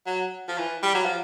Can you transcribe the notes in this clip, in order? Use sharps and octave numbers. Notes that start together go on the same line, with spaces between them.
F#3
F3
E3
G3
F#3
F3